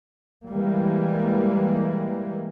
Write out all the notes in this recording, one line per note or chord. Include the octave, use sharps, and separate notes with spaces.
E3 G3 G#3 A#3